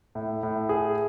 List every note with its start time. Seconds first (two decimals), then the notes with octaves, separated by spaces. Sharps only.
0.15 A2
0.43 A2
0.69 G#4